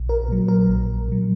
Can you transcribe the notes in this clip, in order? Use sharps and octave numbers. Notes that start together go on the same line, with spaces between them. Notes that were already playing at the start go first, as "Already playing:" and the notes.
Already playing: A#1
A#4
A#2 F#3
A#4
A#1
A#2 F#3